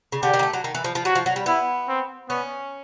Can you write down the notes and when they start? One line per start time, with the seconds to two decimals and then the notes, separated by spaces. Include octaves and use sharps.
0.12 C#3
0.22 D3 G4
0.33 D#3
0.39 A#3
0.43 A3
0.53 F#3
0.64 D#3
0.75 E3
0.84 F3
0.95 F3
1.05 F#3 F#4
1.15 F3
1.26 F#3
1.36 G3
1.46 B3 E4
1.88 C4
2.29 B3 C#4